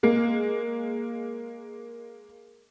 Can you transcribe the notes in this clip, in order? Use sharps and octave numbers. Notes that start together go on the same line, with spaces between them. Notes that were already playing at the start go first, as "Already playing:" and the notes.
G#3 A#3